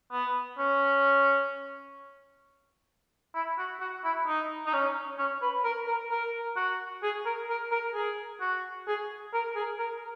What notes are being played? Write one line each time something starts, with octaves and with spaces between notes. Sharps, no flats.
B3
C#4
E4
F#4
F#4
E4
D#4
D#4
C#4
C#4
B4
A#4
A#4
A#4
F#4
G#4
A#4
A#4
A#4
G#4
F#4
G#4
A#4
G#4
A#4